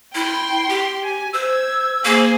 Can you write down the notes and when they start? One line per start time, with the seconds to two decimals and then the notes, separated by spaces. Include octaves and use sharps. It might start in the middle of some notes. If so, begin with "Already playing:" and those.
0.15 E4 G5 C6
0.69 G4
1.03 G#5
1.33 C5 E6 G#6
2.05 A#3 G#4 C5